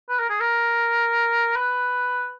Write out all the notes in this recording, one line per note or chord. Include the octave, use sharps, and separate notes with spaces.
B4
A#4
G#4
A#4
B4